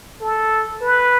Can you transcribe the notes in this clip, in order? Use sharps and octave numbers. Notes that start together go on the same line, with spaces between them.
A4
B4